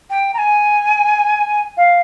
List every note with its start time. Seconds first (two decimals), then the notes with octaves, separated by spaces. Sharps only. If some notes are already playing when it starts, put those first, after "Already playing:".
0.10 G5
0.34 A#5
0.38 G#5
1.77 F5